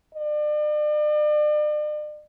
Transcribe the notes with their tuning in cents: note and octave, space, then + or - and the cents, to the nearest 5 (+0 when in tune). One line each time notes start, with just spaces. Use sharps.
D5 +40